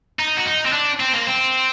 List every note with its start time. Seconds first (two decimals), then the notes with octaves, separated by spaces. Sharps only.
0.19 D#4
0.37 F#4
0.46 D#4
0.66 C4
0.73 D4
1.00 C4
1.14 A#3
1.27 C4